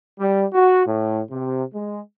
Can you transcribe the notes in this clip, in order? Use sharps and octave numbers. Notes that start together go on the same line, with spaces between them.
G3
F#4
A2
C3
G#3